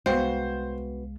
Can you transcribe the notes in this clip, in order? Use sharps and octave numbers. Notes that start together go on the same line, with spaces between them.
C2 G#3 B3 F#4 C5 F5 G5